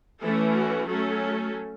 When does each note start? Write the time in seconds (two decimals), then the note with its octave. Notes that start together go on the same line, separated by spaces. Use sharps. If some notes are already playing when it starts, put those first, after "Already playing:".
0.21 E3 A3 C#4 A4
0.53 F#4
0.86 F#3 A3 C#4 A4